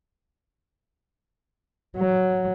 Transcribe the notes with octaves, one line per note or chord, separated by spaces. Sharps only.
F#3